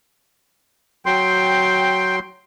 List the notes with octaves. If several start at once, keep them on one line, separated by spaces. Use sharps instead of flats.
F#3 G5 C6